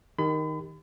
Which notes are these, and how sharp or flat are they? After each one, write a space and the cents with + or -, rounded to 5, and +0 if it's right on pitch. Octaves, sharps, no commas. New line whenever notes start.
D#3 +0 G4 +10 B5 +40